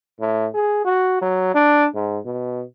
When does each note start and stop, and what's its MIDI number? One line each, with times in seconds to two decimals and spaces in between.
0.20 0.47 45
0.54 0.81 68
0.85 1.17 66
1.22 1.51 54
1.55 1.87 62
1.95 2.19 44
2.26 2.63 47